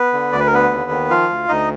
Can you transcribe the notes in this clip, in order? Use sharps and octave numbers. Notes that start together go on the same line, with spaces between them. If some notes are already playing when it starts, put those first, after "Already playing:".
Already playing: B3 B4
D3
D2 D5
B4
A#4
D3 B3 B4
D#2
D#3
F3 F4 F5
D2
D2 D#4 D#5